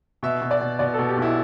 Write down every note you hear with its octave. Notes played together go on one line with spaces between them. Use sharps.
B2 E5
B2
D5
B2
B2 D5
B2 A4
G4
B1
E4